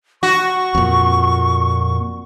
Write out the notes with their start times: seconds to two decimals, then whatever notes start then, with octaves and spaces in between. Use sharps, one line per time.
0.23 F#4 C#6
0.75 F2 A#2